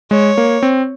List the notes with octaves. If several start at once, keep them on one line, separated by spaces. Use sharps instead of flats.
G#3 C#5
A#3
C4